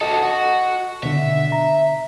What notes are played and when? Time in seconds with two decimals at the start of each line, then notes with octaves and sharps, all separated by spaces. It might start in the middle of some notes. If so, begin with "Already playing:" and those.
0.01 F#4 A4 D#5
0.22 F#4
1.03 B2 D3 E5
1.52 A#5